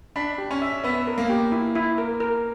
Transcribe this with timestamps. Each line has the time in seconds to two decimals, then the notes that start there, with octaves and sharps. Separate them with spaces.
0.16 D4 B5
0.38 G4
0.51 C#4
0.62 E5
0.84 B3 E5
1.07 A#4
1.18 A#3
1.29 G4
1.52 E4
1.75 E4
1.98 A#4
2.20 A#4